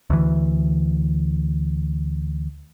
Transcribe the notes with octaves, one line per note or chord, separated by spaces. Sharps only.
D2 E3